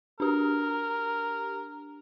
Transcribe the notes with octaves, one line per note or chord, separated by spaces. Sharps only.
D4 G4 A#4